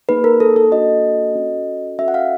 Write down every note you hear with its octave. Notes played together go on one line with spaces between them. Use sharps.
A#3 D#4 G#4 B4
A#4
A4
A4
A#3 D4 F#4 A4 D#5
C#4 F#4 A4
C#4 F#4 A4 E5
F#5
F5